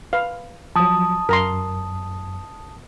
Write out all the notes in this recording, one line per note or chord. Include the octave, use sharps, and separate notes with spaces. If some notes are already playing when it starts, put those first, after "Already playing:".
B4 F5
F3 F#3 A5 D#6
F#2 A#4 A#5 C6